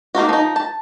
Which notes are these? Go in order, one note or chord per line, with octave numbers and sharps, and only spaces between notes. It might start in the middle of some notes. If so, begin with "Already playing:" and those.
A#3 D#4 F4 F#4
F3 D#4
A5